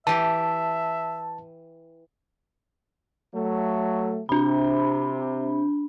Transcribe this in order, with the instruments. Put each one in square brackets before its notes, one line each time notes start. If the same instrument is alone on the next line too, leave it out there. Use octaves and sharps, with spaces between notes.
[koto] E3 G4 [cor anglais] E5 [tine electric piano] A5
[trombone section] F#3 A3
[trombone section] C3 [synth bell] D4 B5